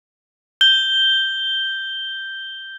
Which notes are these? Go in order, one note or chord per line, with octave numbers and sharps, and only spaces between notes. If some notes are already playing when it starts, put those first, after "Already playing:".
G6 G7